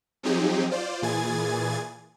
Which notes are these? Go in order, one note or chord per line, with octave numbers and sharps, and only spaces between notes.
F3 F#3 C4 D#4 G4 G#4
F4 C5 D5
A#2 E3 G#4 G#5 G#6 A6